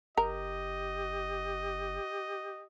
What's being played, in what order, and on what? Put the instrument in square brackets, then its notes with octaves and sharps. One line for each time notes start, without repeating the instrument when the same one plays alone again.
[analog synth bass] F#1 [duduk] G4 [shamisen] A#4 [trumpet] D#5